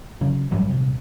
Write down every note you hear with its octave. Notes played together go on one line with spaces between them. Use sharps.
C#3 F#3
A1 G2 F#3 G3
D#1 C3